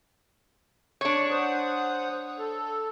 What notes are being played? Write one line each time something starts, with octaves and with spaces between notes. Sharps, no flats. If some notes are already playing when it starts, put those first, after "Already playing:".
D4 C#5
C5 F#5 D#6
A4